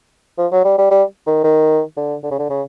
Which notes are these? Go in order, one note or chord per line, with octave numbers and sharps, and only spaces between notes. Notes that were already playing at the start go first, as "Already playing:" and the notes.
F3
F#3
G3
G3
G3
D#3
D#3
D3
D3
C#3
D3
C#3